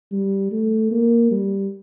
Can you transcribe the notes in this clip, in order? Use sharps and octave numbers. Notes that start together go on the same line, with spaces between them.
G3
A3
A#3
G3